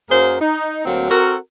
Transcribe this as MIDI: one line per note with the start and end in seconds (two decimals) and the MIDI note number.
0.10 0.37 42
0.10 0.37 54
0.10 0.37 58
0.10 0.37 68
0.10 0.37 70
0.10 0.37 72
0.41 0.82 63
0.85 1.06 38
0.85 1.06 54
0.85 1.06 58
0.85 1.06 60
1.10 1.36 60
1.10 1.36 66
1.10 1.36 69
1.10 1.36 70